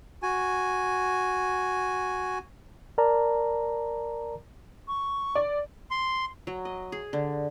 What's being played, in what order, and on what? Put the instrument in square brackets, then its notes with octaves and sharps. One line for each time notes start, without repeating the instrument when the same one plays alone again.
[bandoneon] F#4 G#5
[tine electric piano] A#4 D5 A5 A#5
[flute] C#6
[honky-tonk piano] D5
[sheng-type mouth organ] C6
[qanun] F#3
D#5
G#4
D3